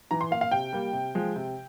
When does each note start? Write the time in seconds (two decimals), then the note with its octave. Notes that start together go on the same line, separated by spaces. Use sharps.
0.11 E3 A#5
0.21 C6
0.31 A#3 F5
0.41 F5
0.51 C3 G5
0.73 G3 A#3
0.93 C3
1.15 F3 G#3
1.36 C3